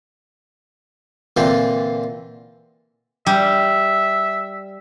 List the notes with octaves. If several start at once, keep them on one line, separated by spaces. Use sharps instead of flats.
A#2 D3 E3 C4 F4
G3 E5